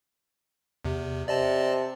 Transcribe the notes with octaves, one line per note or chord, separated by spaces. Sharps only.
E2 C3
C3 D5 D#5 A5